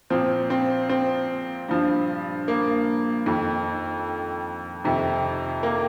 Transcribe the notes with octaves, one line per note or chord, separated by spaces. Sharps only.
A#2 F3 C4
C4
C4
G2 F3
A#3
F2 D#3
F2 C3 D#3
A#3